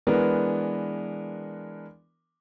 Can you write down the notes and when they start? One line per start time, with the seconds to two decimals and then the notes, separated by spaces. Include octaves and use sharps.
0.07 E3 G#3 B3 D4 A#4